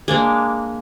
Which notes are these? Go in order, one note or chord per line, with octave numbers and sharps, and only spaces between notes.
G#3 A#3 D4